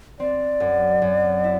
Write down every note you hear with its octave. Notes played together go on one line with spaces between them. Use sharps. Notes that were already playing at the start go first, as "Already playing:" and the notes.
C4 D5
F#2
F#2
E4